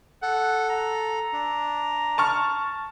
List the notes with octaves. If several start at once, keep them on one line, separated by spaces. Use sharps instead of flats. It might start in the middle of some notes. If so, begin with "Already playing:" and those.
A4 F#5
A#5
D4
A5 C#6 F6